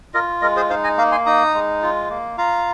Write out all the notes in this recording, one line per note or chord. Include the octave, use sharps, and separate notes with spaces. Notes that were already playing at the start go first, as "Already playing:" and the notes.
F4 A#4 D#5
G#3 A#4 D#5
G#4 C5
D#4 C5 F5
D#5 G#5
A#3 F5 A#5
G#5 C6
D#4 A#5 D#6
G#3
F4
A#3
F4 F5 A#5